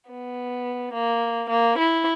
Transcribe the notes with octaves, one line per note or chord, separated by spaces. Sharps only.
B3
A#3
A#3
E4